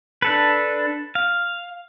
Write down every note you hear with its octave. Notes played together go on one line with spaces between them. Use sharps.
D4 A4 B4
F5